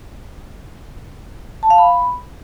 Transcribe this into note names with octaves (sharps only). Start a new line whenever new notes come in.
A5
F5
B5